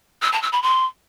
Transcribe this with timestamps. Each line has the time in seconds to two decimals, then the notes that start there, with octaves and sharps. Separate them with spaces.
0.22 E6
0.32 A5
0.42 E6
0.52 B5
0.63 C6